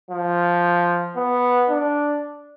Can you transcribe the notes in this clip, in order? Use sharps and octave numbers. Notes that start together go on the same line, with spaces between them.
F3
B3
D4